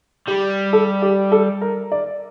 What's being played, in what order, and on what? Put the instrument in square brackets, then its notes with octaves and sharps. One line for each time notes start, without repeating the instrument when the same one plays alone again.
[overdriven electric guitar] G3 [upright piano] G4
[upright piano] A4
G4
A4
A#4
D5